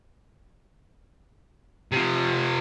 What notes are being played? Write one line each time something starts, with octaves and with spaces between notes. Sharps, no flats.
C3 F3